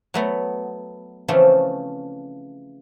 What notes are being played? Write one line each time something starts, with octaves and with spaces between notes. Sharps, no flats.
F#3 A3 B3
C#3 E3 F3 A3 C4